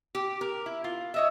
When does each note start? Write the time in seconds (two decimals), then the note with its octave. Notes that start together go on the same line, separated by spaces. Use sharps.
0.15 G4
0.41 A#4
0.66 E4
0.84 F4
1.14 C#5 D#5 E5